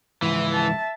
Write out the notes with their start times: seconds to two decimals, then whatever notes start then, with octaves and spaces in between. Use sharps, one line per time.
0.22 C#2 G#2 E3 E4
0.54 E5 A5